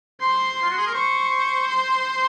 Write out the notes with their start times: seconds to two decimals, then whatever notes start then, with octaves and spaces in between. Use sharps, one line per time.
0.20 C5 C6
0.62 F4
0.70 F#4
0.78 G#4
0.86 A#4
0.94 C5 C#6
1.68 C6